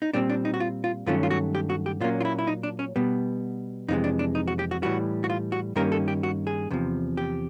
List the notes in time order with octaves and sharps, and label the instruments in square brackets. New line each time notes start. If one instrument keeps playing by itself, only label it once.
[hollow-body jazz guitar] D#4
A#2 G3 C4 D4
D4
D#4
F#4
F4
F4
G2 D#3 F#3 A3 C#4 F4
F4
F#4
G4
F#4
G4
A#2 F#3 A#3 C#4 F4
F4
E4
E4
D#4
D4
C#4
B2 G3 B3
F2 C3 E3 G#3 D#4
D4
D4
D#4
F#4
G4
F#4
A2 E3 G3 F#4
F#4
F4
F#4
G2 D#3 G3 A#3 C#4 A#4
A4
G4
F#4
G#4
E2 C3 F3
G4